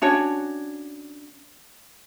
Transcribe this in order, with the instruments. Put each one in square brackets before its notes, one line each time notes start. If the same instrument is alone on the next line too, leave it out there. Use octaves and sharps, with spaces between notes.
[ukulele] C#4 D4 F#4 C#5